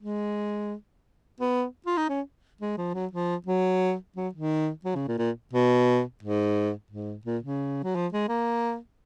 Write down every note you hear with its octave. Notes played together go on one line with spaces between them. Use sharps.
G#3
B3
F4
D#4
C#4
G#3
F3
F#3
F3
F#3
F#3
D#3
F#3
C#3
A#2
A#2
B2
G#2
G#2
A#2
C#3
F#3
F3
G#3
A#3